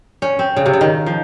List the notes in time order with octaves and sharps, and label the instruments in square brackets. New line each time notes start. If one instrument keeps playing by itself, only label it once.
[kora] C#4
C4
C#3
C3
C#3
D#3
F3